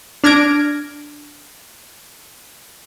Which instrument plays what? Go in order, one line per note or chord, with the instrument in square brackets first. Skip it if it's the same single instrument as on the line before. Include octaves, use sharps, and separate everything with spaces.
[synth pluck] D4 F6 G#6 A#6 D7